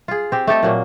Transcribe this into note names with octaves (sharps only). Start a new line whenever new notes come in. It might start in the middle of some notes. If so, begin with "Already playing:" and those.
F4 G#4
C4 G4
A3 G4 A4 D#5
A#2 F#3 A#3